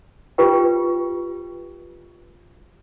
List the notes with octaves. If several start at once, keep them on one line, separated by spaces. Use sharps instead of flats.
F4 G4 B4 G5